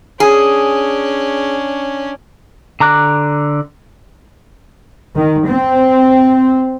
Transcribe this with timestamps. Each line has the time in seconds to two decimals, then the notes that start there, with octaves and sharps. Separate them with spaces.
0.20 C#4 D4 G#4
2.80 D3 A#5 D6 F#6
5.16 D#3
5.47 C4